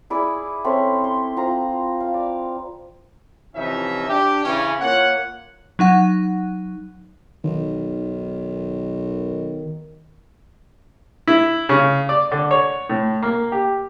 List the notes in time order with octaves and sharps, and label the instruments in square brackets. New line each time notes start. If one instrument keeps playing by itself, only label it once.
[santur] E4 G#4 D5
C4 C#4 A4 E5
C6
C4 F4 A#5
F5
D5
[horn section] C3 E3 F3 C#4 D#4 E5
D4 G4
C#3 E3 C#4
A#3 F4 C#5 F#5
[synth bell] F#3 D#4 F#5 F#6
[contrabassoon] B1 [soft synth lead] D#3
[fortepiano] E4
C#3
D5
D3
C#5
A2
A#3
G4